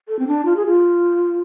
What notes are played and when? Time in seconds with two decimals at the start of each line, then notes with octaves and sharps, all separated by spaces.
0.08 A4
0.19 C4
0.27 D4
0.45 F4
0.56 G#4
0.67 F4